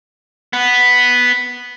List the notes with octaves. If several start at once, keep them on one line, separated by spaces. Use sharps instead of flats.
B3